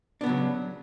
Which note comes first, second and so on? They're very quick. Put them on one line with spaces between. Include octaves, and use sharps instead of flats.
D4 B3 C#3 F#3